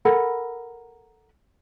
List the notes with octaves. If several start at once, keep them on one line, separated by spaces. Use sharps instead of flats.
A4 A#4 F#5 B5